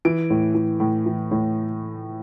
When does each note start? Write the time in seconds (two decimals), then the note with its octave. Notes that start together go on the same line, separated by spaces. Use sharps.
0.05 E3 D7
0.30 A2
0.55 E3
0.80 A2
1.06 E3
1.31 A2